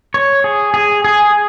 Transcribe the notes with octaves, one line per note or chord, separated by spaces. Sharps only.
C#5
G#4
G#4
G#4